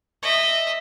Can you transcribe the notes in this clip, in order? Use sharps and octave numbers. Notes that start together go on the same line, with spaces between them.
D#5 E5